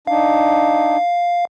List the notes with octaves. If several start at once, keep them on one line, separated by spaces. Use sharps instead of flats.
D4 D#4 F5